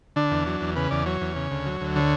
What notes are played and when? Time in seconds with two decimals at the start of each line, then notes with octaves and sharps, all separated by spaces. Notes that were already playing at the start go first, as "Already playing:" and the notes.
0.16 D3 D4
0.31 E2
0.46 F#3
0.61 E2
0.76 C#3 B4
0.91 E2 D5
1.06 F#3 C#5
1.21 E2
1.36 C#3
1.51 D2
1.66 F#3
1.81 D2
1.96 D3 C#5